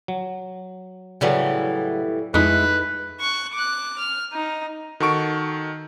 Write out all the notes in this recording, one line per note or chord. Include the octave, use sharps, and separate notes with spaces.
F#3
A2 C#3 E3 F#3 G3 F#4
F2 G#3 A3 D#4 E4 B4
C#6 F#6
D6 F#6
F6
D#4
D#3 F#4 A4 C#6 D7